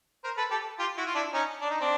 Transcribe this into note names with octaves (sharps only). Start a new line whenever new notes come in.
A#4 C5
A4 B4
G4 A4
F4 G4
E4 F#4
F4
D4 E4
C#4 D#4
D4
D#4
C4 D4